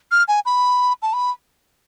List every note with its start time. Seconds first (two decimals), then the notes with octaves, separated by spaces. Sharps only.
0.11 F6
0.28 G#5
0.45 B5
1.02 A5
1.13 B5